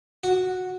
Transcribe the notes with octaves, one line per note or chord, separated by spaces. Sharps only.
F#4